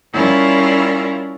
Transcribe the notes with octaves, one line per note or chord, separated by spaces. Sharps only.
G3 C#4 E4 F4 A#4